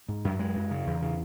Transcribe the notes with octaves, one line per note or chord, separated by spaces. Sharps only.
G#2
F#2
G#3
F#2
C#3
E2
C#3